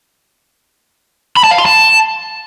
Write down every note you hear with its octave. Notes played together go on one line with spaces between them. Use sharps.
B5
A5
F5
C6
A5